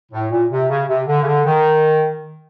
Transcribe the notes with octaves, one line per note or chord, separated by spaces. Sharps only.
A2
A#2
C3
C#3
C3
D3
C#3
D3
D#3